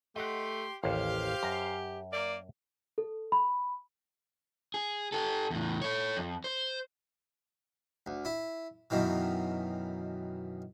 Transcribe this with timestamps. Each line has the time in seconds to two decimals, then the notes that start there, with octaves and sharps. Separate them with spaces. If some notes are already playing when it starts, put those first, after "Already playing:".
0.16 A3 G4 D#5 F#5 C6
0.84 A1 D#2 G4 C5 F5
1.43 F#2 A#5
2.13 A#3 D5
2.98 A4
3.32 B5
4.74 G#4
5.12 G4 A4
5.50 E2 A2
5.82 A4 C#5
6.17 F2
6.44 C5
8.06 D2
8.25 E4
8.90 F#2 B2 D#3 E3